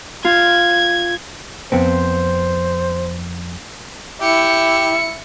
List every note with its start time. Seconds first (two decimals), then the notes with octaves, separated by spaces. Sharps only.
0.25 F4 G#6
1.72 F2 B3 C4 C5
4.22 E4 G4 C#7